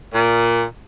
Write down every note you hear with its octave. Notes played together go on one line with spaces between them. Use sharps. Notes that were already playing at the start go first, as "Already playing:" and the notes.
A#2